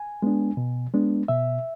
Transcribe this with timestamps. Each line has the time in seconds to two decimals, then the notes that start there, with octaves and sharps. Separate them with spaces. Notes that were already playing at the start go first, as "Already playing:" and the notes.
Already playing: G#5
0.22 G#3 B3 D4
0.57 B2
0.94 G#3 B3 D4
1.28 B2 E5